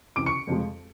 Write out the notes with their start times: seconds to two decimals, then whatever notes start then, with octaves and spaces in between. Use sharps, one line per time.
0.16 C#2 C3 E3 D6 D7
0.26 C#6 C#7
0.47 F2 C3 F3 G#3